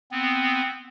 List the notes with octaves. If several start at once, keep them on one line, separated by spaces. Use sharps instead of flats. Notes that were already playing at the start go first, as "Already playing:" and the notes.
B3 C4